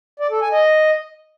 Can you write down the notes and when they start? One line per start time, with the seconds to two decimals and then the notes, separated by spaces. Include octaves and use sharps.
0.20 D5
0.30 A4
0.41 G#5
0.52 D#5